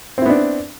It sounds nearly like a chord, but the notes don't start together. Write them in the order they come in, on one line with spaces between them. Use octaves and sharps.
C4 E4 B3 D4